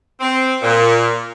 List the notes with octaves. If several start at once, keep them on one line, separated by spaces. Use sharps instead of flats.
C4
A#2